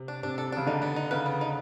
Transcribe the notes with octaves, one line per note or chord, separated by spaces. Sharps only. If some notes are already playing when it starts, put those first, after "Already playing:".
Already playing: C3
D4
C3 D4
A4
C#3 D4
D3 D#4
B3
D#4
C#3 B4
B3
D#4